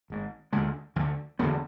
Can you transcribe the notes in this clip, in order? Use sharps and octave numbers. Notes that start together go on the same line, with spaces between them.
G#1 G#2
D2 D3 G#3
D2 D3 E3
E1 E2 D3 B3